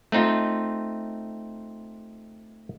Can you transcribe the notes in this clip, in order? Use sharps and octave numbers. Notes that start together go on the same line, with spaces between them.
A3 C4 D#4 F4